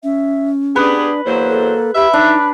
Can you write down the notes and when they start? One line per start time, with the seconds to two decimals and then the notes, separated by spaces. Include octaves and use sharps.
0.04 C#4 E5
0.76 B3 D4 G4 G#4 B4
1.26 E2 F#3 A#3 C5
1.49 A4
1.95 G4 E5 B5
2.13 D4 D#4